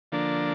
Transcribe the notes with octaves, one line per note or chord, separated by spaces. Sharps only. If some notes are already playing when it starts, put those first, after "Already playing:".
D3 F3 A#3 D4